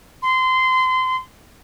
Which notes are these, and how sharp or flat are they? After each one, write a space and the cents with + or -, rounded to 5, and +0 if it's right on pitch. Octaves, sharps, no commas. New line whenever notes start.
C6 -25